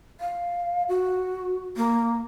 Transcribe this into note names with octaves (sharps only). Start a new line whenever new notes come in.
F5
F#4
A#3